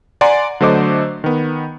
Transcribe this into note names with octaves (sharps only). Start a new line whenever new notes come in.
D5 F#5 G#5 A#5 C6
D3 F#3 A3 C5 D#5 D6
D#3 B3